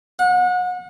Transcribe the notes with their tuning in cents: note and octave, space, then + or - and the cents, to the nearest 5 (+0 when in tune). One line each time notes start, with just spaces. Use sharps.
F#5 -35